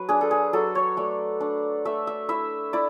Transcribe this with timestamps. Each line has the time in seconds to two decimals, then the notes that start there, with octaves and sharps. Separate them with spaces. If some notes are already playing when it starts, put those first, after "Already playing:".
Already playing: F#3 B4
0.09 D4 G#4
0.21 A4
0.31 G#4
0.53 F#3 A4
0.75 C#5
0.97 A3 D5
1.41 D4
1.85 A3 E5
2.07 E5
2.29 E4 E5
2.73 E4 D5